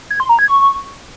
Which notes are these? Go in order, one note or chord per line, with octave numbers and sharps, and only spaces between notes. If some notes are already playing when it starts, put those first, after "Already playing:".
G#6
C6
A#5
G#6
C#6